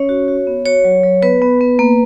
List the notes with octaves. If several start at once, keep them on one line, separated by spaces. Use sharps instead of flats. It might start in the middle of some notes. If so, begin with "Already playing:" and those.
Already playing: C#4 C#5
F#4
F#4
B3
F#4 C#5
F#3
F#3
B3 B4
B3
B3
A#3